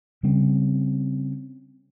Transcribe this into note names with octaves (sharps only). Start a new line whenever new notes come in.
C#3 G3 C4 C#4